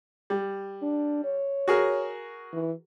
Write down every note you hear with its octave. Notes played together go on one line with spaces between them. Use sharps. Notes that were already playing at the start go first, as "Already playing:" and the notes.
G3
D4
C#5
F#4 G#4 A#4
E3